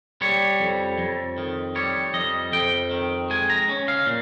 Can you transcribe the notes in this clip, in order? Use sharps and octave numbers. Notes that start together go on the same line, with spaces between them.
G3 C#5
F2
F2
D#3
G3 C#5
F2 D#5
F2 G5
D#3
G#3 G#5
A#5
C#4
F5
A#2